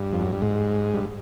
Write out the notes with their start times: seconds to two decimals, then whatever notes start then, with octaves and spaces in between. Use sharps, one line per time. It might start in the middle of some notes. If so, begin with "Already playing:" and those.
Already playing: G2
0.13 F2
0.21 F#2
0.32 G2
0.42 G#2
0.94 G2